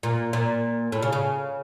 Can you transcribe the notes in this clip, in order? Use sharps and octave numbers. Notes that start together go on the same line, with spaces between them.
A#2
A#2
A2
C#3
C#3